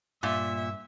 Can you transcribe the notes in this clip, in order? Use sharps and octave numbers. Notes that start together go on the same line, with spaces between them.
G2 A#2 E5